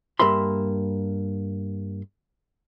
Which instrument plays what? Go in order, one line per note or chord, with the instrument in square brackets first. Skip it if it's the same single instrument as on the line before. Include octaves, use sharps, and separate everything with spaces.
[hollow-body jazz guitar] G2 A#3 E5 B5 C6